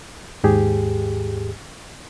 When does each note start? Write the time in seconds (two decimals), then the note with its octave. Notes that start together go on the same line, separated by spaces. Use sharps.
0.44 D#2 G#2 G4 G#4